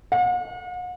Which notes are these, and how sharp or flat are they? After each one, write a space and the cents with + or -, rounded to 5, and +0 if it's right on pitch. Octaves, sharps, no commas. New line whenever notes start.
F#5 -45